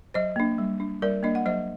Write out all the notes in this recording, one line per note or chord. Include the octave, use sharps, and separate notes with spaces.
F#3 C5 D#5
A#3 D4
G3
D4
G3 A#4 D5
A#3 D4 D#5
F#5
F#3 C5 D#5